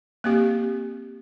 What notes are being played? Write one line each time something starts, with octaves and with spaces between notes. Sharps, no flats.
A#3 C4 G4